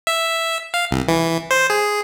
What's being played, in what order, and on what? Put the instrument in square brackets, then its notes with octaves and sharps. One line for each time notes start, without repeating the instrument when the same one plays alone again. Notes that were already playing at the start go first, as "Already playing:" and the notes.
[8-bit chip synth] E5
F5
C2
E3
C5
G#4